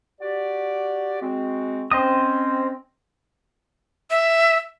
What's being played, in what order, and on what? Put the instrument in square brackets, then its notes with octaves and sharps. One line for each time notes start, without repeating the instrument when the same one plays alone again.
[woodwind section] F#4 G4 D5
G#3 C4 F#4
[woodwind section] C4 C#4 [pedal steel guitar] C5 D#5 D#6
[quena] E5